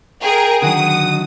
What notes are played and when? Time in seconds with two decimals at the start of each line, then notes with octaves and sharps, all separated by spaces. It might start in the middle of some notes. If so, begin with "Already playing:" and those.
0.23 G#4 A#4 G5
0.62 D3 D#3 F#3 F#5 D#6